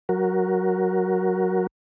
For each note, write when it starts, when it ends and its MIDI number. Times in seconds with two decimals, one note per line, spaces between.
0.09 1.67 54
0.09 1.67 66
0.09 1.67 70